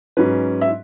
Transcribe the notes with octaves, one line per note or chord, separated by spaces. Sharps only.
G#2 F#3 C#4 B4
E5